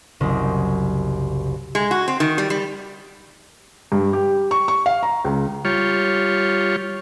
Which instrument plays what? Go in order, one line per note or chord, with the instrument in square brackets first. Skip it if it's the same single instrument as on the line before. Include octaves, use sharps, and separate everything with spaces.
[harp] F#1 C2 C4 D#5
[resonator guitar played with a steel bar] G#3
F#4
C4
D#3
G3
G3
[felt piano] G2
G4
C#6
C#6
F5
A#5
C#2
[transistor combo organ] G3 F4 C#5